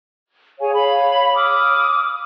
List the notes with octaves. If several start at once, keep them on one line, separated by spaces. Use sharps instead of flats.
G#4 C#5 F5 G#5
C#5 F5 B5
D6 D#6 F6